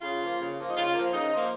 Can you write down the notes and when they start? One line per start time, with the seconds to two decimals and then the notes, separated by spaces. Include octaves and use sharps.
0.02 C#3 F4
0.21 F3 A#3
0.39 C#3
0.58 F3 A#3
0.70 D#4
0.76 C#3 F4
0.94 F3 A#3
1.13 C#3 D#4
1.33 F3 A#3